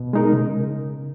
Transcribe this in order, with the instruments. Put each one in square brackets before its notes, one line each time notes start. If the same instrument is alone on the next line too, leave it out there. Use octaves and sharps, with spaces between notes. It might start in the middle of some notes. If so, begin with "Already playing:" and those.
Already playing: [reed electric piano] B2
G#3 D#4 A#4
C#3